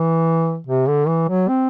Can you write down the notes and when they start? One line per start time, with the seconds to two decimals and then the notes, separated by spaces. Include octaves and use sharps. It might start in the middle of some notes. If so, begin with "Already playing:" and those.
Already playing: E3
0.67 C3
0.88 D3
1.08 E3
1.28 F#3
1.48 C4